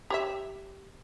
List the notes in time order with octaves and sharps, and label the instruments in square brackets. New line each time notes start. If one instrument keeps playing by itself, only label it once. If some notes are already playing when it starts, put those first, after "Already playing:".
[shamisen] G4 C#5 E5